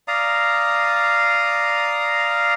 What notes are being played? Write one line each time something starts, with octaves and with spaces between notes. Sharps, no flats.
D5 F5 A#5 D#6